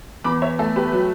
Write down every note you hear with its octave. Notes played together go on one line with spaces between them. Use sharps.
E2 B5 D6
C#5 E5
A3 A4
G4 B4
F#3